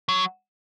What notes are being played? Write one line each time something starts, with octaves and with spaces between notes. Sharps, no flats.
F#3